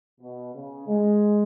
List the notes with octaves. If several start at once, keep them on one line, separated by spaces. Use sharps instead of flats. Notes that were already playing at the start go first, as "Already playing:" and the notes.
B2
C#3
G#3